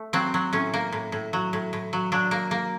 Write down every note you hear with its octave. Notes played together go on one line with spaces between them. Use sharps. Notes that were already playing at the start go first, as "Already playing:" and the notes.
Already playing: A3
F#3 C4
F#3
A2 C#4
A#3
A2
A2
F#3
A2
A2
F#3
F#3 D4
A#3
A#3